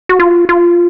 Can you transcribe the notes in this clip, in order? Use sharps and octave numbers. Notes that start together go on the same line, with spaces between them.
F#4
F4
F4